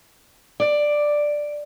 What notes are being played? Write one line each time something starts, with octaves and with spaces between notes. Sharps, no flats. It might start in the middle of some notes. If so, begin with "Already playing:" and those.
D5